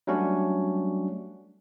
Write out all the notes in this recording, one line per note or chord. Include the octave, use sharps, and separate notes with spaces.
F#3 G3 A3 C#4 D4 F#4